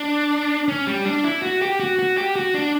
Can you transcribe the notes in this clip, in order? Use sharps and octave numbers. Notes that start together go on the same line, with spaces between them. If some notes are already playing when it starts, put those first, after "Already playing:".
Already playing: D4
C#4
G3
D4
E4
F#4
G4
F#4
F#4
G4
F#4
D4